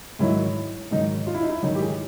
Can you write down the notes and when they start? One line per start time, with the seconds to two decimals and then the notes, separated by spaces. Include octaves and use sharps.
0.19 G#2 D#3 F#3 E4
0.91 G#2 D#3 F#3 D#4
1.27 F4
1.35 E4
1.42 D#4
1.49 E4
1.63 G#2 D#3 F#3 D#4
1.75 G4
1.81 G#4